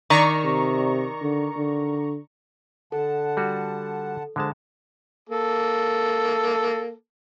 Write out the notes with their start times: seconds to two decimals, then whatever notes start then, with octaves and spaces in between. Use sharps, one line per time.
0.10 D#3 D5 A#5 C#6
0.44 C3
1.22 D3
1.57 D3
2.92 D3 A4 F#5 A5
3.37 G3 F#4
4.36 D3 F3 G#3 A5
5.29 A#3 A4